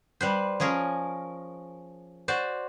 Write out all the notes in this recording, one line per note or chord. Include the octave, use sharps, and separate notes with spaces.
G3 B4 C5
F3 C#4 G#4 A#4
F#4 C5 D5